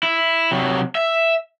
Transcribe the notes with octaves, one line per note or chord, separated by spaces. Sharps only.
E4
C3 F#3
E5